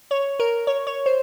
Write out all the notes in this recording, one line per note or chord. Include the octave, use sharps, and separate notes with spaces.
C#5
A#4
C#5
C#5
C5